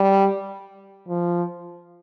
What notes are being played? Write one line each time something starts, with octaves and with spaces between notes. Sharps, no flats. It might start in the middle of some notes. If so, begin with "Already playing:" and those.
Already playing: G3
F3